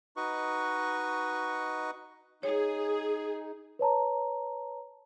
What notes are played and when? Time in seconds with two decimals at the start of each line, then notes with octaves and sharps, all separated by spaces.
0.16 D#4 F#4 B4 D#5 C#6
2.43 D#4 G#4 C#5
3.79 B4 C#5 A5 A#5